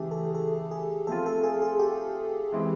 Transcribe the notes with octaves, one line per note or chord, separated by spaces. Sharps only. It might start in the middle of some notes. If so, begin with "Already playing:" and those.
Already playing: C#3 E3 A3 G4 G#4
A4
A4
G#4
F3 A3 C4 F4 A4
A4
G#4
G#4
G4
E3 G#3 C4 E4